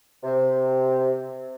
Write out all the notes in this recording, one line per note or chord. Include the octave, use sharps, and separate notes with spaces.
C3